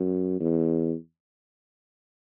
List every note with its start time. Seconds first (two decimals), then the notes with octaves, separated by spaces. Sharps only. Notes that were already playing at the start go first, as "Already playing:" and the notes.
Already playing: F#2
0.40 E2